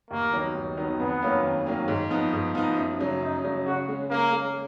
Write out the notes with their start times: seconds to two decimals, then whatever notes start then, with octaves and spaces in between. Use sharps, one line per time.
0.11 D#2 A#3
0.33 D#3 F#3 B3 D#4
0.55 D#2
0.77 D#3 F#3 B3 D#4
1.00 F2 B3
1.22 D#3 F#3 A#3 C#4
1.43 F2
1.66 D#3 F#3 A#3 C#4
1.88 G#2
2.11 F3 B3 D#4
2.33 G#2
2.55 F3 B3 D#4
2.77 F#2
2.99 C#3 F#3 C#4
3.21 F#2 D#4
3.44 C#3 F#3 C#4
3.66 C#3 F#4
3.88 G#3 C#4
4.10 C#3 A#3
4.32 G#3 C#4